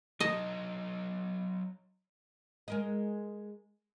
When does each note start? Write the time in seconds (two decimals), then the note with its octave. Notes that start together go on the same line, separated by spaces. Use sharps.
0.20 F#3 D#4 D#5 A5
2.68 G#3 A#4 D#5